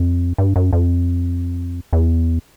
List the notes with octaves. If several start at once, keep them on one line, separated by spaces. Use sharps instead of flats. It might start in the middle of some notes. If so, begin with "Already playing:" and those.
Already playing: F2
G2
F#2
F2
E2